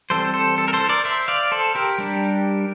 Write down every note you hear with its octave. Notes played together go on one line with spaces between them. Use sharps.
E3 G3 C4 A4 C5
A4 C5
A4
A#4
A4 C5
A#4 D5
C5 E5
D5 F5
A4 C5
G4 A#4
G3 D4